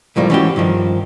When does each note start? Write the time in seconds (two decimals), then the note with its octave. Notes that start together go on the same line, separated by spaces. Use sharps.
0.16 C#2 A2 F3 G3 A#3
0.30 E3 G#3 C#4 D4 F#4 G4
0.56 G2 D#3 F3